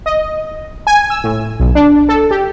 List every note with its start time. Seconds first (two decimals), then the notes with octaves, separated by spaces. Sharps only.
0.06 D#5
0.87 G#5
1.10 E6
1.24 A2
1.60 B1
1.75 D4
2.09 A4
2.31 G4